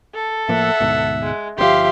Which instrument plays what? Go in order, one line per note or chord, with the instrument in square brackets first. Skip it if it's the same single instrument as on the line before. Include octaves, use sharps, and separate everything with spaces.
[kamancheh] A4
[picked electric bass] A2 F3 A#3 [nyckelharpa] E5 F#5
[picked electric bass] D2 G#2 B2
[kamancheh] G#3
[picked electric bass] G1 A#2 F3 [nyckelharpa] G4 F5 [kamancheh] E5 C6